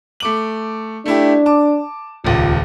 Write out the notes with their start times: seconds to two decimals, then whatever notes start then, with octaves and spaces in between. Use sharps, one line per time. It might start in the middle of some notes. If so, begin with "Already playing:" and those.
0.20 A3 D6 F#7
1.06 A3 D4 E4 G4
1.46 A5 D6
2.24 D#1 C#2 F4